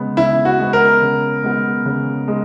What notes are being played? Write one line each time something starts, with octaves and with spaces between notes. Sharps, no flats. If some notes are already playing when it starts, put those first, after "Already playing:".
Already playing: C#3 G#3 B3
C#3 E4
F#4
G#3 B3
A#4
C#3
G#3 B3
C#3
G#3